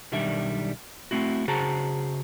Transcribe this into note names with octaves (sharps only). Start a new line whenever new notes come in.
B1 D#3 G3 D4 E5
A3 C4 E4 F#4
C#3 F#4 G#4 C5 A5 A#5